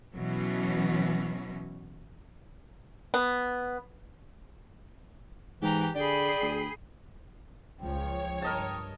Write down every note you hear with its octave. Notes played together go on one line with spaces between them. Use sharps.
B2 E3 F#3 C#4
B3
G#2 E3 G4 A#5
D3 G#4 D5 G5 B5
D2
C#2 F3 C#5 G5
G2 A#4 D#5 A5